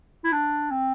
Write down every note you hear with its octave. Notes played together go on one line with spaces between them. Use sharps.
E4
D4
C4